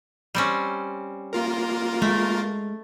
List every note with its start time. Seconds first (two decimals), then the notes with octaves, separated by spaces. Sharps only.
0.35 G3 C4 C#4
1.33 A#3 F4 A#4
2.02 G#3 A3